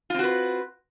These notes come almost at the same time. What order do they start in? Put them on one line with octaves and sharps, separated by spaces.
F4 C4 F#4 B4